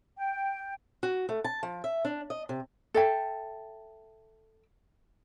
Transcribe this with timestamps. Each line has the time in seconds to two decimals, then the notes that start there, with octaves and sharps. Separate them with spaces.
0.16 G5
1.03 F#4
1.29 A3
1.44 A5
1.63 F3
1.84 E5
2.05 D4
2.30 D#5
2.49 C3
2.94 A4 E5 G5